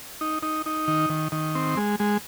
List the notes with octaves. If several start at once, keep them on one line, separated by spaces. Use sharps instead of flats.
D#4
D#4
D#4
D#3
D#3
D#3
C4
G#3
G#3